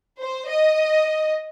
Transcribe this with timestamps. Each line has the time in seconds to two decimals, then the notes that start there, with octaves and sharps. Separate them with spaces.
0.20 C5
0.50 D#5